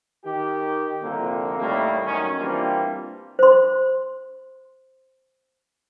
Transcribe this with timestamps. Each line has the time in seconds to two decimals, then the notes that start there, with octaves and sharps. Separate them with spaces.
0.25 D#3 G4
1.03 C2 F2 D3 A#3
1.59 D#2 A2 G3 A3 A#3
2.06 F#2 D#3 C#4
2.39 E3 G3 A#3 C4 D4 F4
3.39 C5 C6